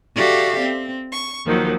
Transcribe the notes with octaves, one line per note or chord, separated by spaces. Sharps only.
F#4 G4 A4 D5 E5 F5
C4
C#6
D#2 D#3 F3 F#3